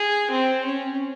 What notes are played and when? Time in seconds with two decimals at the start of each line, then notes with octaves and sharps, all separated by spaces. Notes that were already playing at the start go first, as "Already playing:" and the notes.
Already playing: G#4
0.30 C4
0.65 C#4